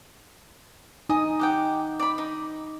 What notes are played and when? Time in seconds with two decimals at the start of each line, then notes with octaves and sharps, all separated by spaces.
1.09 D#4 D#5 G#5 D#6
1.39 G4 F#5 G5
1.99 D5 B5
2.18 D#4